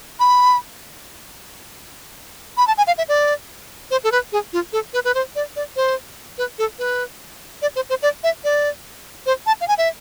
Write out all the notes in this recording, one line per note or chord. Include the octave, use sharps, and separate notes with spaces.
B5
B5
A5
G#5
F5
E5
D5
C5
A4
B4
G#4
F4
A4
B4
B4
C5
D5
D5
C5
B4
A4
B4
D5
C5
C5
D5
E5
D5
C5
A5
F5
G#5
E5